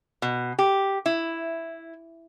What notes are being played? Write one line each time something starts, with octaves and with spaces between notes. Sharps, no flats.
B2
G4
E4